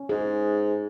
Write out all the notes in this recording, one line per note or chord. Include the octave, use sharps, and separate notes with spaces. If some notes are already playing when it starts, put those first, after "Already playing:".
Already playing: C#4
G#2 G#4